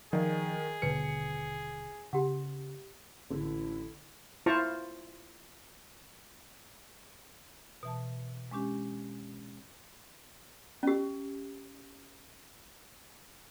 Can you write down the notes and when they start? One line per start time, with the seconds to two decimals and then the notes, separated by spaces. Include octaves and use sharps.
0.13 D#3 F3 G#4 D5 D#5 F5
0.82 D#1 B2 D3 B4 C#5 C#7
2.13 C#3 G4 F#5
3.30 A1 D3 E4
4.46 E4 F4 C5 A5 A#5 C#6
7.83 B2 E3 A5
8.51 G#3 C#4 D4 G4
10.83 C#4 G4